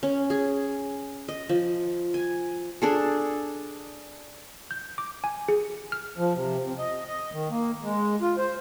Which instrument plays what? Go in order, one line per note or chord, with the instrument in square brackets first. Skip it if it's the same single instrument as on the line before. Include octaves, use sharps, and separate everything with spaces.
[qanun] C#4
G#4
D#5
F3
G#5
D4 G#4 A4
[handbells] G6
D6
G#5
G#4
F6
[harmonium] F3
C3
C3
D#5
D#5
D#3
A#3
G#3
F4
C5